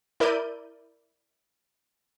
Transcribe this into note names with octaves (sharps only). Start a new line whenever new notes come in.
E4 A#4 D5 G6 D#7